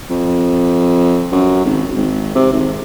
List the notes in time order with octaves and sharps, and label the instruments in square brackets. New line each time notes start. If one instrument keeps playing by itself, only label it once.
[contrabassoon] F2
F#2
G#1
G#1
C3
G#1